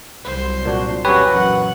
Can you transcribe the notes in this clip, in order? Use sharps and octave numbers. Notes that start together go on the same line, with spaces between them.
C2 F#3 C5
A#2 D4 F#4
E2 A#2 F#3 C#4 G4 B4 C#5
F#2 F#5